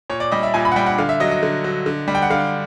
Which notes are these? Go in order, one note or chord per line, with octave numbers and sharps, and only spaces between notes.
A#2 C#5
D5
G3 D#5
E5
A#2 G#5
B5
F#5
G3 G5
F#5
D3 F5
E5
F#3 D#5
D#5
D3
F#3
D3
G3
G5
F#5
D3 F5